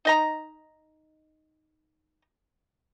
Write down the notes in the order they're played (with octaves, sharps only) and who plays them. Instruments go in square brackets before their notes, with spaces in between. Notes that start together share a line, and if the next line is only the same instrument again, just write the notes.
[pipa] D#4 D#5 A#5